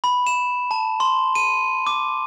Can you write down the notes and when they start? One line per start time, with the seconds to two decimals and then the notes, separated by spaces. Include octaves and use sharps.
0.04 B5
0.27 E7
0.71 A5
1.00 C6
1.35 D#7
1.87 D6